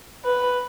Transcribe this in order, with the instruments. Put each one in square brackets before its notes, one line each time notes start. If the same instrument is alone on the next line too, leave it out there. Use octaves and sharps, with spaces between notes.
[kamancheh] B4